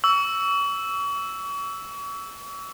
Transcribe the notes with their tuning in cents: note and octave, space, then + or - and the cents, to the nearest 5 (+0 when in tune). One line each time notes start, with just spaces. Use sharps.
C#6 +40 E6 +0